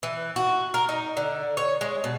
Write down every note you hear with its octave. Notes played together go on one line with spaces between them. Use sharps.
E3
F#4
A#4
D#4
D3
C#5
G#3
B2